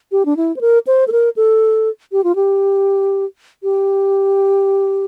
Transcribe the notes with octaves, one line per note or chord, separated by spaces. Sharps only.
G4
D4
E4
C5
A#4
C5
A4
A#4
A4
G4
F4
G4
G4